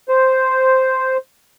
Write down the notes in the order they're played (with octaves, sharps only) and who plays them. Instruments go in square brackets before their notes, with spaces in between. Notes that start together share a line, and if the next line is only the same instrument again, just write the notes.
[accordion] C5